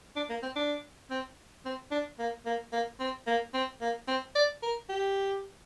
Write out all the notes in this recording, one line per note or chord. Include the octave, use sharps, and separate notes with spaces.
D4
A#3
C4
D4
C4
C4
D4
A#3
A#3
A#3
C4
A#3
C4
A#3
C4
D5
A#4
G4